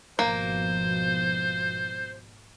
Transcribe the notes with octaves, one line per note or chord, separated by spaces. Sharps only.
G#1 B2 F3 A#3 C5